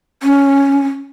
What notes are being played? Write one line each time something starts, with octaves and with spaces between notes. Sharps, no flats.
C#4